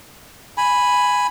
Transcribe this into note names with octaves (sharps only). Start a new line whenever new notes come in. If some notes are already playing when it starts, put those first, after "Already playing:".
G#5 B5